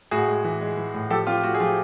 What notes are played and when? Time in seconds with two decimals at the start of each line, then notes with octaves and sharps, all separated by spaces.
0.11 A2 F#4 G#4
0.28 G#3
0.44 E3
0.61 G#3
0.77 E3
0.94 A2
1.10 F3 G4 A4
1.27 C4 F4 G4
1.43 A3 F#4
1.55 G#4
1.60 F3 F4 G4